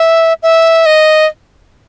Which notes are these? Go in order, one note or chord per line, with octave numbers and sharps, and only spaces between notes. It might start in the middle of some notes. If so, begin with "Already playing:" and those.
Already playing: E5
E5
D#5